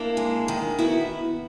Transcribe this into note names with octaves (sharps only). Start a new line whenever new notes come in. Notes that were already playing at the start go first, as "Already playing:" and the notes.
Already playing: A#3 D4 E4
G#3
D#3
B3 E4 F#4